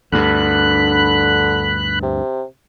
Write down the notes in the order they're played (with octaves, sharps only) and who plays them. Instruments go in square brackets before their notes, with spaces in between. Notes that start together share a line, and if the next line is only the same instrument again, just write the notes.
[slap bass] D2 G2 [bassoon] D3 [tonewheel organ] B5 F#6
[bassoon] C3